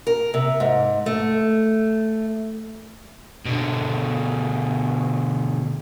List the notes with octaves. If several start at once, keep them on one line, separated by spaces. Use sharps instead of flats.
A#4
C3
G#2
A3
B2 D3